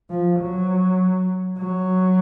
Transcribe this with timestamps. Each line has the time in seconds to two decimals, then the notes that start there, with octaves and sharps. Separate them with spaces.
0.10 F3
0.40 F#3
1.58 F#3